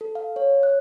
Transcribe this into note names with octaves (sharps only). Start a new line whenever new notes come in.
A4
F5
C#5
F#6